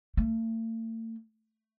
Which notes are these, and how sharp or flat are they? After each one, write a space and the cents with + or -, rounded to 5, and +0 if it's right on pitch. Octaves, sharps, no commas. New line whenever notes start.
A3 +45